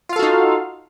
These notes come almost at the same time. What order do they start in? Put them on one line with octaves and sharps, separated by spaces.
F4 F5 A4 F#4 D#4